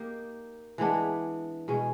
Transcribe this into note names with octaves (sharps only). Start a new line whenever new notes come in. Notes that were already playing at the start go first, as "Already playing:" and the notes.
Already playing: A#3 D#4 G4
E3 G#3 B3 D4
B2 G#3 C#4